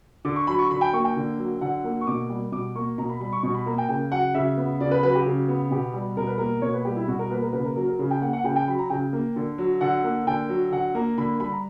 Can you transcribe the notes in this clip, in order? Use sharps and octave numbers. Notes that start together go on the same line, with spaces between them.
D3 D6
C#6
F#3 B5
C#6
D3 B5
G5
A#3 C#6
G5
D3
F#3
D3 F#5
A#3
C#6
B2 D6
G3
B2 D6
A#3 C#6
B2 A#5
B5
G3 B5
C#6
B2 C#6
B5
A#3 A#5
G5
C#3 G5
F#3 F#5
C#3 E5
B3
C#3 D5
B4
F#3 B4
G4
C#3
B3
B2 G4
G3
B2 A#4
B4
A#3 A#4
B2 C#5
B4
G3 G4
E4
B2 F#4
A#4
A#3 B4
A#4
C#3 B4
A#4
F#3 A#4
A#4
C#3
G5
A#3 F#5
F#5
C#3 G5
G5
F#3 B5
A#5
C#3 G5
A#3
D3
F#3
D3 F#5
A#3
D3 G5
F#3
D3 F#5
A#3 A#5
D3 B5
G3 B5
A#5